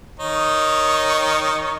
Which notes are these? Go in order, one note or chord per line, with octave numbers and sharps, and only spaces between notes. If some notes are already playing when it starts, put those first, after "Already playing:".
D#3 D#4 C#5